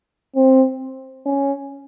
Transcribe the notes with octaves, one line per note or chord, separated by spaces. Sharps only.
C4
C#4